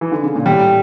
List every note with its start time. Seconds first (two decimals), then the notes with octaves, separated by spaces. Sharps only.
0.01 E3
0.12 D3
0.23 C#3
0.36 A#2
0.46 A2 G3